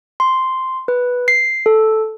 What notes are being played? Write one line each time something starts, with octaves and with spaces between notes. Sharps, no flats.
C6
B4
C7
A4